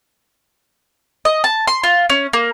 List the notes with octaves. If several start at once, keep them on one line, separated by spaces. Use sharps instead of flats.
D#5
A5
C6
F4
C#4
A#3